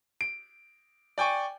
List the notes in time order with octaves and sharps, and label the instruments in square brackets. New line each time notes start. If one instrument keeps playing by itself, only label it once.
[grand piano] D7
D5 G5 G#5 C#6